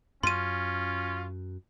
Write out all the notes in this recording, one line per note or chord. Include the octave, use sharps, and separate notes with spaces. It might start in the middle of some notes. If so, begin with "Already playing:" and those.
F#2 C#4 F4 C6 D#7